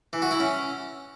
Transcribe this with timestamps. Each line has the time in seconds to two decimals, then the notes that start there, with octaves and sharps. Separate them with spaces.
0.13 E3
0.22 F#4
0.31 E4
0.40 C#4